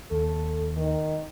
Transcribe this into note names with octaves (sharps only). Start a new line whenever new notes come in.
D#2 A4
D#3